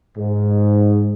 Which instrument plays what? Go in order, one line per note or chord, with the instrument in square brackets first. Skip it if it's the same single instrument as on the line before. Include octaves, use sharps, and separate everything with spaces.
[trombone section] G#2